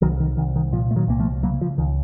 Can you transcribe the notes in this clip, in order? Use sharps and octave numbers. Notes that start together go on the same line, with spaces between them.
C2 D#3 F#3
D#3
C2 D#3
D#3
A#2 F3
A3
D#3 F#3
C2 A#3
F3 A3
C#3 F#3 A#3
F3
C#2 D#3